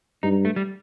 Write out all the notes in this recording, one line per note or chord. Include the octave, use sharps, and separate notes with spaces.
G2 D#4
A3
G3